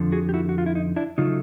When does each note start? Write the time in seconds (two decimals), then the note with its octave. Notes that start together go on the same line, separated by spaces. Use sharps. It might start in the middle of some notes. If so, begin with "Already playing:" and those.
Already playing: F2 D3 F3
0.12 F#4 G#4
0.29 G4
0.34 E4 F#4
0.49 F#4
0.58 F4
0.66 E4
0.75 D#4
0.96 D4 E4
1.18 C#3 F#3 A3 D#4 F4